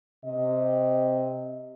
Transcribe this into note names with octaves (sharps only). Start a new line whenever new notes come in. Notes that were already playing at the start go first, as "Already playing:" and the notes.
C3 D#5